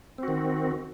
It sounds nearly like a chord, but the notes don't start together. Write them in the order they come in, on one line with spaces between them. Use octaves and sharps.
C4 F#4 D#3